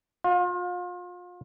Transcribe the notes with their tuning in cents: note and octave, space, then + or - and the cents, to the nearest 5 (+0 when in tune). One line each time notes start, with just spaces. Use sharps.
F4 +35